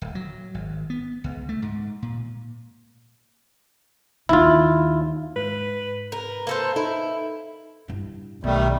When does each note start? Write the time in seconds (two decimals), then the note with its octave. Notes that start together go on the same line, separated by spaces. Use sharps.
0.02 D1
0.15 F#3
0.54 G#1
0.90 B3
1.24 C#2
1.49 A3
1.62 G#2
2.02 A#2
4.29 D#2 D#3 E4 F4
5.36 G#2 B4
6.12 A#4 B4
6.47 A#3 A4 C5
6.76 D#4 E4 A4
7.88 G2 E4
8.44 B1 D#3 G3 A3